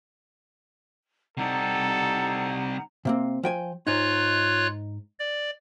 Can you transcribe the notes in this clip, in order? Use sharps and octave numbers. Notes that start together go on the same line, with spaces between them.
C3 G3 D#4 A4 F#5 A#5
C3 A#3 C4
F3 G5 G#5
G#2 D#4 F4 C#5 F#6
D5